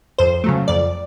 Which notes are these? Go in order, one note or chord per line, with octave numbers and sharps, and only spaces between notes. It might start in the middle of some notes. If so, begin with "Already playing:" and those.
F2 C5
C#3 F#3 A3
F2 D5